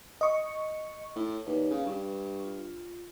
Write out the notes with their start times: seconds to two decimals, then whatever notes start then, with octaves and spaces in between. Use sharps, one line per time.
0.21 D#5 C#6
1.16 A2 C#5
1.46 D#2 B4 C#5 D5
1.70 C#3 B4 F5
1.86 G2 C#6
2.44 F4